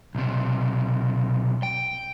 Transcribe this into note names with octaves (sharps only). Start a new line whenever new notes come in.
B1 C3
G5